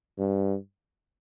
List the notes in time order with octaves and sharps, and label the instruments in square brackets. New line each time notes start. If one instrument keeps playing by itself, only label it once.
[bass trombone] G2